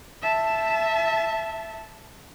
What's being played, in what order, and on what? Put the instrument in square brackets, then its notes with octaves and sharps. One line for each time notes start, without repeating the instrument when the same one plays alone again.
[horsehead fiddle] E5 A5